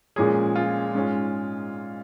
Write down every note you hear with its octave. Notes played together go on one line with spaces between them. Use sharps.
A#2 F3 G#3 C#4 G#4
F4
G#2 G#3 C#4